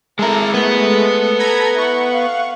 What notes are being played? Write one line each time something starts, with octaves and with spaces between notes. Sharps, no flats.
G#3 E4 A4 A#4
G#3 A3 B3
A4
A#5 B5 G#6
E4 F#5 C#6
F5